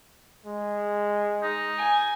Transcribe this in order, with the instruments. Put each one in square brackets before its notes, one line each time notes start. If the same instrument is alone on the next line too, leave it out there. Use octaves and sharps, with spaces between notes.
[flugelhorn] G#3
[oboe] D#4
[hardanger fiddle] G#5